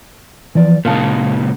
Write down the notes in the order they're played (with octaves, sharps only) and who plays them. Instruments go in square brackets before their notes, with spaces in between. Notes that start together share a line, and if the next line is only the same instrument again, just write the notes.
[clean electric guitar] E3 F3 D5
[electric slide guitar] A#2 C#3 G#3 [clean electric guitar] A#4 F5 A5